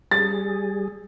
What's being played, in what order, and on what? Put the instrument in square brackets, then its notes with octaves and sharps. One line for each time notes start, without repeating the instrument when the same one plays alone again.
[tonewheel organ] G3 G#4 [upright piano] A6